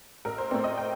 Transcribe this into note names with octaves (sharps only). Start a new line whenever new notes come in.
A1 A#4
C5
A2 A3 C4 D5
D#5
G5